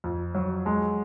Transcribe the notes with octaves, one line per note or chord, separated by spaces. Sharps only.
F2
F#3
G#3